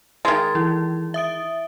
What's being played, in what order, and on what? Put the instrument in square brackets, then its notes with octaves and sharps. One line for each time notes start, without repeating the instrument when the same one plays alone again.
[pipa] D#3 G#3 [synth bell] G#6 A6
[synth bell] E3 E4
E5 D#6 D7